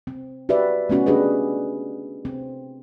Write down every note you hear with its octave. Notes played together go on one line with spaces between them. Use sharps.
C4
F#4 G4 B4 D5 E5
A3 B3 C#4 F#4
D4 G4 G#4 B4 D#5
C4